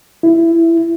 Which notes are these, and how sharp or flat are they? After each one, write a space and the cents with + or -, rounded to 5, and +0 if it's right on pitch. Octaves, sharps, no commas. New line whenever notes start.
E4 +15